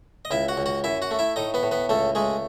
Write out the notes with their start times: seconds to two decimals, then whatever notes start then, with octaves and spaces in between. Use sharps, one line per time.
0.25 D#5
0.31 C#2 E4 E5
0.48 F#4 F#5
0.57 C#2
0.66 F#4 F#5
0.84 F#2 E4 E5
1.02 F#4 F#5
1.11 A3
1.19 E4 E5
1.36 A2 D#4 D#5
1.54 B3 B4
1.63 A2
1.72 B3 B4
1.89 C#2 A3 A4
2.15 G#3 A3 G#4